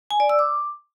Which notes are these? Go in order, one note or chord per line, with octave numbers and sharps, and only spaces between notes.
G#5
D5
E6
D6